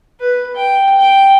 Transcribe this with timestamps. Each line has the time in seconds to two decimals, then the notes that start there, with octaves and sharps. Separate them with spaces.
0.20 B4
0.56 G5
1.00 G5